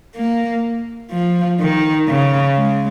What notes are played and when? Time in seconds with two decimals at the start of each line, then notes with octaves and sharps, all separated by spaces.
0.15 A#3
1.11 F3
1.60 D#3
2.08 C#3
2.56 G#3